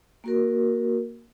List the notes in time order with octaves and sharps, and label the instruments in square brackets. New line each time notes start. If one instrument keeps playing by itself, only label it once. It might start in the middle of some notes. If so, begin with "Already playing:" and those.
[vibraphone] A#3 F#4 A#4